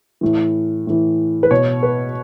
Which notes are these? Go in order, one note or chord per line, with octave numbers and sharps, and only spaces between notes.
A2 E3
A2 E3
B4
B2 C#5
B4